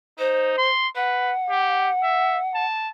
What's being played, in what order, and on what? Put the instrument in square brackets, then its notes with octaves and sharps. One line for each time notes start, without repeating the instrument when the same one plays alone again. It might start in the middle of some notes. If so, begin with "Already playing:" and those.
[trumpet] D#4 [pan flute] C5
[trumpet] C6
[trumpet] B4 [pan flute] F#5
[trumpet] G4
E5
A5